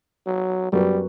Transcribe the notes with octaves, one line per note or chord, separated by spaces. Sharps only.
F#3
F#2 F#3 G3 B3 F#4 B4